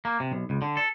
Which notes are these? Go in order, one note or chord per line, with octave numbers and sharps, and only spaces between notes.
A#3
C3
B1
C#2
D3
A4